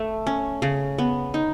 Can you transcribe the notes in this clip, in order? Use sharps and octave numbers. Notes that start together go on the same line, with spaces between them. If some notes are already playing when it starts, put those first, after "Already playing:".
Already playing: A3
C#4
C#3
B3
D#4